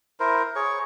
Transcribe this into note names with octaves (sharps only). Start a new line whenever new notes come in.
E4 A#4 C5
G#4 C#5 C#6